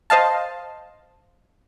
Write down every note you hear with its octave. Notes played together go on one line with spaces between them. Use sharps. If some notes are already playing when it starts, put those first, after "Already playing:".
C5 D#5 F5 A5